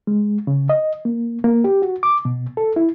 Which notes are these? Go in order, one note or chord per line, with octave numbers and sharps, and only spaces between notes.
G#3
C#3
D#5
A#3
A#3
G4
F#4
D6
B2
A4
E4